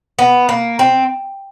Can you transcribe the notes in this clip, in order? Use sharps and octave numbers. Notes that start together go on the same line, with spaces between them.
B3
A#3
C4